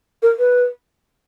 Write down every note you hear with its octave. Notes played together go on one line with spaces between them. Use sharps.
A#4
B4